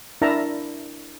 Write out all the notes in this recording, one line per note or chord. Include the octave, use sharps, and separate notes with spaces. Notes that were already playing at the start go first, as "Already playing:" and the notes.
D4 E4 A#4 E5 A5 A#5